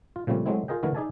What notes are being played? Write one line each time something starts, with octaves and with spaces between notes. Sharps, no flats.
F4
A#2 C#3 F3 G3 A3 C4
F#3 G#3 A3 C4 E4
F4 G#4 A#4 D#5 G5
D3 E3 A3 E4 F#4 A#4
D#4 G#4 D5 E5 G#5 A5